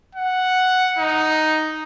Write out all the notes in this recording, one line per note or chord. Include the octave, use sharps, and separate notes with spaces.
F#5
D#4